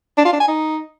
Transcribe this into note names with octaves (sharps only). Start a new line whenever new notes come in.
D4
F4
D4
G#5
D#4